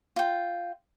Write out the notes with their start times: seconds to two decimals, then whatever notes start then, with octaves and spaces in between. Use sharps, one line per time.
0.16 F4 G5